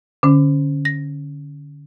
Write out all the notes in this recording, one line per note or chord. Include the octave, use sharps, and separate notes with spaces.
D3 C#4
A#6